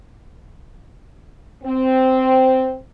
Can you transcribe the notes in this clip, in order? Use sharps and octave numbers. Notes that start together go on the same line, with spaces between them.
C4